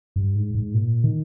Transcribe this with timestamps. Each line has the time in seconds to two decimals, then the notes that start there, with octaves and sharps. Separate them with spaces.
0.16 G2
0.35 G#2
0.55 G#2
0.74 A#2
1.04 D#3